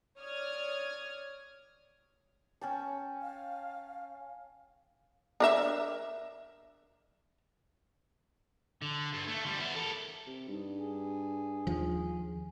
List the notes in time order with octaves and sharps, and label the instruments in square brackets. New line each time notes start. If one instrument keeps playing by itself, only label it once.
[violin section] C#5 D5 D#6 F6 G#6
[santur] C#4 G5 A5
[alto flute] F5
[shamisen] D4 A#4 E5
[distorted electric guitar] D3
G2
A3
D3 G3
B3 E4
A4 A#4
[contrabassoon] C3
[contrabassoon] G2 [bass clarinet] D#4
[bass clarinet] G#4
[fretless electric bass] D#2 F3